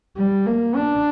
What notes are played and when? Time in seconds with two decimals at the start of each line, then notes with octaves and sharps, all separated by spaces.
0.17 G3
0.46 A#3
0.75 D4